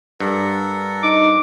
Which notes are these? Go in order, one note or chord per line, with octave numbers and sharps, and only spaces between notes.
G2 A4 A#4 F#5
D#4 D6